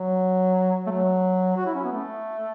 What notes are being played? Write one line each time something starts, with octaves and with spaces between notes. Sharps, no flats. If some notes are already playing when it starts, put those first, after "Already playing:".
Already playing: F#3
A3
F#3
F#4
E4
C#4
B3
A3